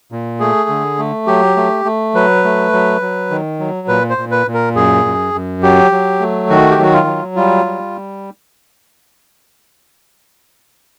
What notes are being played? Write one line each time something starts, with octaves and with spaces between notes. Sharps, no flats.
A#2
A3 G#4
D3
A3
F#3 G4
A3
A3
F#3 B4
A3
F#3
F#3
D#3
F#3
A#2 B4
C5
A#2
B4
A#2
A#4
F#2 G#4
F#2
F#2
F#3 G4
F#3
A3
D#3 F#4
G4
F#3 F#4
F4
F#3
G3 F4
G3